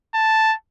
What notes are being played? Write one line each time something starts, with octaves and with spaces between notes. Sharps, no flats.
A5